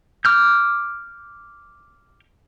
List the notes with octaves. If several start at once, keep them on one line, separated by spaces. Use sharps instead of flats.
D6 F6 G6